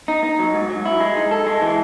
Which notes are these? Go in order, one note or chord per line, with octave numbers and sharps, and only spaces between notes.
D#4
D#4
F#3
G#2
F#3
E4
G#3
D#4
A4
G#3
E3